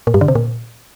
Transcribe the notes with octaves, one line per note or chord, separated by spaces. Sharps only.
A#2
G2
D3
C3
A#2